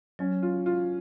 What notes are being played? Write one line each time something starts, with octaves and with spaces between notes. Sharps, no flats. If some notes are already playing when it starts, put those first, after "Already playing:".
F#3 C#4
F4
F4